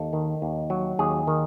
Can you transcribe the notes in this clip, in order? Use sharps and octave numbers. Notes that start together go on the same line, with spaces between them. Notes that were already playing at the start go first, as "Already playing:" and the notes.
Already playing: D#2 A4
D#3
D#2
F#3
D#2 G#4
D#3